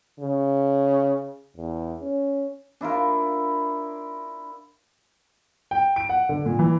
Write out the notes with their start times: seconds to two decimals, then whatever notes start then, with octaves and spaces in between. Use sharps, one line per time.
0.20 C#3
1.57 E2
2.02 C#4
2.81 D4 E4 F4 A#4
5.71 G5
5.96 D7
6.09 F#5
6.29 D3
6.46 A#2
6.59 E3